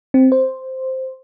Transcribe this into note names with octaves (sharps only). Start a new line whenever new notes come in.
C4
C5